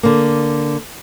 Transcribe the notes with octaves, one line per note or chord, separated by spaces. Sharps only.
D3 A#3